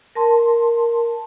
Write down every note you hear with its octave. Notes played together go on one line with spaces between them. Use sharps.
A#4 A5 C6